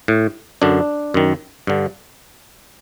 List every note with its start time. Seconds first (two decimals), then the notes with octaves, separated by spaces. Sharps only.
0.08 A2
0.62 F#2 D3 D4
1.14 F#2 D#3
1.67 G2 D3